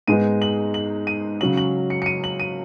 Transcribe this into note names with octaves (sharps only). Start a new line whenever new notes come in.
G#2 G#3 B3 D#4 D#7
F#7
F#7
D#7
C#3 F#3 C#4 F#7
F#7
C#7
C#7
D#7
F#7
D#7